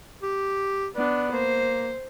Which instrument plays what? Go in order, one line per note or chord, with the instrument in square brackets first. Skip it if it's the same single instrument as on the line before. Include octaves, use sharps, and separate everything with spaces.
[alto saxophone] G4
[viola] B3 D4 [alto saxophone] D5
[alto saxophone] A#3 [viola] C5